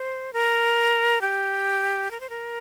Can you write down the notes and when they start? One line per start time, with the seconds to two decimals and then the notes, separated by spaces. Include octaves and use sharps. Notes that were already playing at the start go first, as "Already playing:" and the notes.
Already playing: C5
0.33 A#4
1.21 G4
2.11 A#4
2.20 C5
2.29 A#4